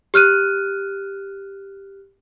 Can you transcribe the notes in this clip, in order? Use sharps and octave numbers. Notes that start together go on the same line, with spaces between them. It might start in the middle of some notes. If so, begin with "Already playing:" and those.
G4 F6 F#6 D#7